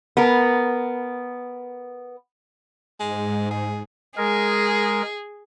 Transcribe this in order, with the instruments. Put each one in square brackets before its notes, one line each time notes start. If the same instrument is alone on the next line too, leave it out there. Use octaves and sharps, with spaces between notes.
[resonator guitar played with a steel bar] B3 A#4
[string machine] G#2 [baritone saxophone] G#3
[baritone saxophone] G#4
[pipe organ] G#3 A#4 [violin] G#4